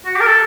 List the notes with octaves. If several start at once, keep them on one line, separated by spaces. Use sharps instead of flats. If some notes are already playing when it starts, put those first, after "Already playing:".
F#4
G4
A#4
A4